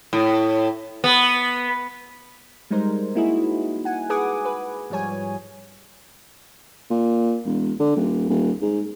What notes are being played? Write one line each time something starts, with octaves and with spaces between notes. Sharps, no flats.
A2
B3
G3 G#3 D#4 A#4 C5
A#3 D#4 E4 F#4 G#4
F#5 G#5
G#4 B4 F#5 G#5 D6 D#6
B4
G#2 F3 G3 C#5 G#5
A#2
E1
D3
D#1
D#1
G#2